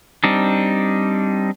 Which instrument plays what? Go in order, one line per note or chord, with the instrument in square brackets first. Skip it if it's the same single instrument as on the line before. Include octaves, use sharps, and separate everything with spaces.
[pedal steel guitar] G3 C4 D4 D#4